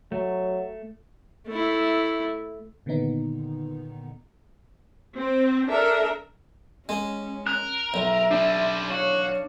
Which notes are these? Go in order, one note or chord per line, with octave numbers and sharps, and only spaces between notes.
F#3 A3
A3 E4
A#2 D3 D#3 B3 D#4
C4
D4 A4 A#4 E5
G#3 C#4
A#4 F#6
B1 E5
G3 D4 E4
F#4 C#5 F5